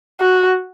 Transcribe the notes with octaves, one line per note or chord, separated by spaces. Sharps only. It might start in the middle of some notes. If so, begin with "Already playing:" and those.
F#4